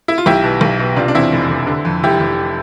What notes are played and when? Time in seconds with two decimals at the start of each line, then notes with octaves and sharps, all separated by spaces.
0.08 E4
0.18 F4
0.26 B1 E4 G4
0.44 B2
0.61 B1
0.79 B2
0.96 C3 D4 F4
1.08 D4
1.15 E2 C4 E4
1.32 F1
1.50 F1
1.67 D3
1.85 F2
2.03 F1 E4 G4
2.20 F1